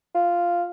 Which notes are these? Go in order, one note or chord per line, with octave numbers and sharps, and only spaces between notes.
F4